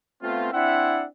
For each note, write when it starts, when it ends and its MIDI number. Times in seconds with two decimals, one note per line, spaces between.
0.22 0.50 57
0.22 0.50 59
0.22 0.50 60
0.22 0.50 65
0.53 1.05 60
0.53 1.05 62
0.53 1.05 64
0.53 1.05 76
0.53 1.05 78